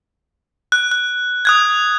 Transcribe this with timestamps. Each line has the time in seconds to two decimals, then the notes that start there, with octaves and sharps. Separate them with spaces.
0.72 F#6
0.92 F#6
1.45 D#6 F#6 G#6